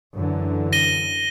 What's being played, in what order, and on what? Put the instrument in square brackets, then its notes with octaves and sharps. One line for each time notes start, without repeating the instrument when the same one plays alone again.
[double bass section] F#2 D3 E3
[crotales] A#6 D#7 G7